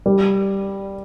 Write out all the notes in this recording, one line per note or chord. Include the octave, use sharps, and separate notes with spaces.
G3